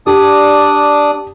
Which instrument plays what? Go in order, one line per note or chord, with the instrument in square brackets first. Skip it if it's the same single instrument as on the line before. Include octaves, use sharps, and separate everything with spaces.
[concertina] D4 D5 D#6 [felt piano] G4